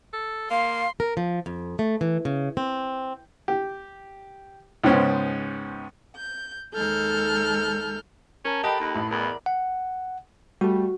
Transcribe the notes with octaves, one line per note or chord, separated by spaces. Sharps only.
A4
A#3 F5 C6
A#4
F3
F2
A3
E3
C#3
C4
G4
C#2 G#2 B3 C#4 C5 G5
G6
D#2 G#3 D#4 A4 F6 G6
C#4 A#4 A5 A#5
G4 A4 C5 D#5 F#5 G5 A5 B5
D#2
A1 A2
E2 A#4 D5 B5
F#5
G3 A3 F#4